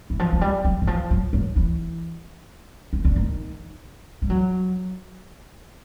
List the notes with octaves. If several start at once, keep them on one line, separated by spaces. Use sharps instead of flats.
E3
F3
F#3
G3
F#3
E3
F3
F#3
F#3
E3
D#3
D3
D#3
G3
F#3